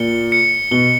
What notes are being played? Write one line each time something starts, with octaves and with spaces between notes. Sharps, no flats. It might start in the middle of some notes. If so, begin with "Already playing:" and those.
Already playing: A#2 C#7 G7
C#7
B2 G7